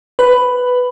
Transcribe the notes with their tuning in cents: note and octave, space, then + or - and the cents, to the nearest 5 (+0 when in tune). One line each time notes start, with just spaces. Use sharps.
B4 +10